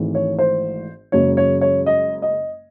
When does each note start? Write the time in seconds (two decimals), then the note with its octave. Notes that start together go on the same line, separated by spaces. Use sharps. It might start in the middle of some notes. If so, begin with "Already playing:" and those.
Already playing: G#1 G#2 E3 A3
0.15 C#5
0.39 C5
1.12 F#1 F#2 C#3 G#3 C#5
1.37 C#5
1.61 C#5
1.86 D#5
2.22 D#5